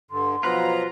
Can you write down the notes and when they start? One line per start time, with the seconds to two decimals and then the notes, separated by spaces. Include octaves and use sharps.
0.11 G2 D3 C6
0.43 B2 F3 F#3 B3 F4 B4 A#5